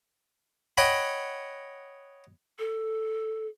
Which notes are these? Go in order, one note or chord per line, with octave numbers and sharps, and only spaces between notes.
C#5 D#5 F#5 G5 B5
A4